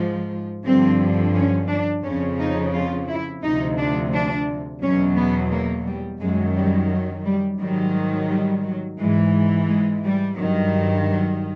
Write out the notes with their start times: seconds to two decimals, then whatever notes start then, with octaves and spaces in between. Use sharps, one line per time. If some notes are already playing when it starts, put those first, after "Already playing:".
Already playing: G#2 F3
0.64 G2 D3 F3 C4
1.35 C#4
1.69 D4
2.04 F2 C#3 F3 C#4
2.39 D#4
2.74 F4
3.08 E4
3.43 D2 C3 F3 D#4
3.78 D4
4.13 D4
4.82 E2 B2 F#3 C#4
5.17 B3
5.51 A#3
5.87 G3
6.21 F#2 D#3 F#3 G#3
6.56 G3
6.91 F#3
7.26 G3
7.60 G#2 D#3 F#3 G3
8.29 G3
8.65 F#3
9.00 G#2 E3 G#3
9.69 G#3
10.04 G3
10.39 G2 D#3 F#3
11.08 F#3